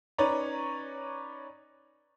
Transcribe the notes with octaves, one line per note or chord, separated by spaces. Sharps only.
C#4 D#4 B4 C#5 D5 A#5